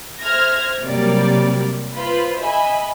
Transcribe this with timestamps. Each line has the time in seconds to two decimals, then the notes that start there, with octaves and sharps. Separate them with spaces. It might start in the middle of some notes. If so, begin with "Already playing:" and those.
0.21 C5 E5 F6 G#6 A#6
0.81 C3 F#3 G3 A#3 A#4 D5
1.93 F4 B4 C5 B5
2.40 D#5 E5 G#5 B5